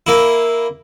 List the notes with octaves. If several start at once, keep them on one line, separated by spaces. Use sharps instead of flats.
A#3 E4